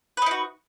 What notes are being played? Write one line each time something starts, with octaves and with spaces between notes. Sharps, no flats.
D#4 E4 F#4 B4